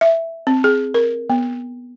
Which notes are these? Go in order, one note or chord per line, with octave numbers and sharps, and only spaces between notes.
E5
C4
G#4
A#4
B3